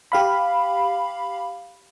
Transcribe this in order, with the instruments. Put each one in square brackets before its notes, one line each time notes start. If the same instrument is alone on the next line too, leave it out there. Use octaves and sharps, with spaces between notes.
[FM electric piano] G4 F5 B5